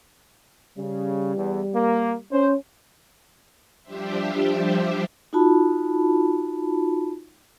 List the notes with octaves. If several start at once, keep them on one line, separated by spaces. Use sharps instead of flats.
C#3 G3
E2
A#3
C#4 C5
F3 G3 D4 G4 C5 E5
D#4 F4 F#4 A5 B5